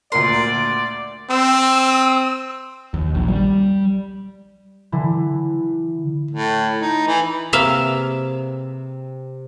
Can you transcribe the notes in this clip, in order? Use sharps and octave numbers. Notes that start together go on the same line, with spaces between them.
D2 A#2 A#4 D5 C6
C4 E6
D#2
A#1
G3
D3 E3 E4
A2
D#4
E3
C3 A#3 G#4 B4 E5 F5